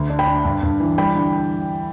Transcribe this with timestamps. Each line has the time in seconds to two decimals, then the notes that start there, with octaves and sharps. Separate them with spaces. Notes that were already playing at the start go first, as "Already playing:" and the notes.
Already playing: D2
0.10 D4
0.19 G5 B5
0.27 D4
0.45 G2
0.63 G2
0.80 E3
0.98 G3 G5 B5
1.15 D3